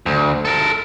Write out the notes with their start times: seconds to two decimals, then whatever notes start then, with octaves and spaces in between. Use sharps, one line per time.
0.06 D2
0.45 A4 A#4